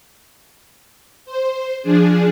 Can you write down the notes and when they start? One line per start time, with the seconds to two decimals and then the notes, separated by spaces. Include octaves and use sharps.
1.26 C5
1.82 F3 D4 G#4